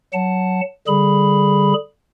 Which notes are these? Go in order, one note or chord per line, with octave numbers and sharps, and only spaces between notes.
F#3 F#5 A5
D3 G3 G#4 B5